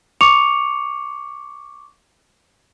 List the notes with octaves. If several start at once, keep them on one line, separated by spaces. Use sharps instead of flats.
C#6 D6 C#7 F7